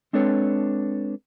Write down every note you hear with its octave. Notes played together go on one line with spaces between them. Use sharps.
G#3 C4 D4 A4 B4 C#5